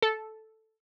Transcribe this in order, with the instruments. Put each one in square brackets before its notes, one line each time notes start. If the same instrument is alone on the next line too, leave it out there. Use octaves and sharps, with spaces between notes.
[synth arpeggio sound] A4